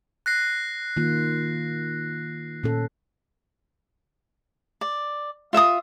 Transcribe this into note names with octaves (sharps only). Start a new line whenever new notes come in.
F#6 A#6 C7
D#3 A#3 F4
A#2 C#4 A4
D5
F4 E5 F5 D#6